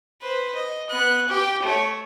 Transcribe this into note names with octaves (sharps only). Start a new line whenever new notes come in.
B4 C5
D#5
B3 F#6
G4 G5
A3 C#5